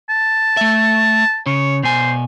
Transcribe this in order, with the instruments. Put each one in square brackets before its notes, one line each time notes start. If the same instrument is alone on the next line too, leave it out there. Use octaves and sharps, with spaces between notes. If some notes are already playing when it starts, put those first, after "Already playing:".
[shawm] A5
[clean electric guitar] A3 E5
[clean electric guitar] C#3 [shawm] C#5
[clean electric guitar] B2 G#5 [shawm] C5